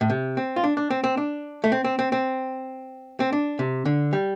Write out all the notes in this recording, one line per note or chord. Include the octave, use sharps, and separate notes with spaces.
A2
C3
C4
F4
D4
D4
C4
C4
D4
A3
C4
C4
C4
C4
C4
D4
C3
D3
G3